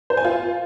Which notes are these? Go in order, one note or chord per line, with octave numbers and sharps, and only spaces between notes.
C5
G#5
F4